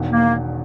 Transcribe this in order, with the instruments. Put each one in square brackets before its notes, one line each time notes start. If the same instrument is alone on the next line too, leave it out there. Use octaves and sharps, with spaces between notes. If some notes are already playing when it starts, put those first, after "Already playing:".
Already playing: [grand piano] E1 E2 D#3
[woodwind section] A#3